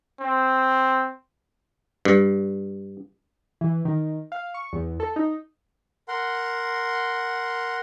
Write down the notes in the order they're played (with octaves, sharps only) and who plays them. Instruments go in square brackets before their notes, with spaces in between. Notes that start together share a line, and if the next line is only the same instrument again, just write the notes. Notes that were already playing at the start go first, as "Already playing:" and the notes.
[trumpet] C4
[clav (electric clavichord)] G2
[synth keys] E3
D#3
F5
C#6
E2
A4
D#4
[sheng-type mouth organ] A#4 F#5 C6